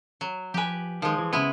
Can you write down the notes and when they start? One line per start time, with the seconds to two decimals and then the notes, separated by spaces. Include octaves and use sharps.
0.21 F#3
0.54 F3 G4 B4 G#5
1.02 D#3 F3 G#3
1.18 E3
1.33 C#3 G#3 B3 E4